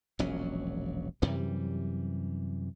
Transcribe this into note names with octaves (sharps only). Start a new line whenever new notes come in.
E1 A#1 F#3 C#4
F#2 C3 E3 G3